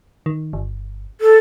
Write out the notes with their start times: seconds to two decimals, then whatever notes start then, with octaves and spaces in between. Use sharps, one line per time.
0.26 D#3
0.53 G1
1.21 A4